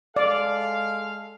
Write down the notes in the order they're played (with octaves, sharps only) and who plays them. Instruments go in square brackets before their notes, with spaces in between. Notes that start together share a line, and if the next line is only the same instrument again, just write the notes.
[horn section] G#3 A4 F5 [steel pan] D5